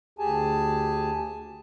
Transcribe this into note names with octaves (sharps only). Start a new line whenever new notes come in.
D2 G4 G#4 G#5 A5